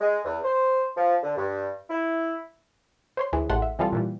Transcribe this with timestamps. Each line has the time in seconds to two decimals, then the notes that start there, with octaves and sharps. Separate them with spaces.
0.01 G#3
0.24 E2
0.44 C5
0.96 F3
1.23 D3
1.37 G2
1.90 E4
3.17 C5 C#5 C6
3.33 D2 E3 G#4
3.49 A1 A2 G#3 A3 F#5 C6
3.62 E5
3.79 C3 E3 F3 G3 F4 A4
3.92 A#2 E3 G3